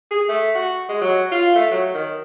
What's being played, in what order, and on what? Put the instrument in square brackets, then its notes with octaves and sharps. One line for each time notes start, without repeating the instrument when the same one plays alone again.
[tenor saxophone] G#4
A3
F#4
G#3
F#3
F4
A3
F#3
D#3